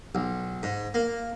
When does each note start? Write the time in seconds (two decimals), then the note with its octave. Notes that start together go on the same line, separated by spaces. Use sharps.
0.15 B1
0.63 G#2
0.94 A#3